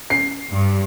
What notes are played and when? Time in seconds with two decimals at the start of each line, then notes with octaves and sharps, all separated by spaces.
0.10 C7
0.51 G2